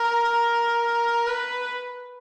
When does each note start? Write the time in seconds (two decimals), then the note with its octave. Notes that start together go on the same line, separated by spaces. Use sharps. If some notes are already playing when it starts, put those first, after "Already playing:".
Already playing: A#4
1.27 B4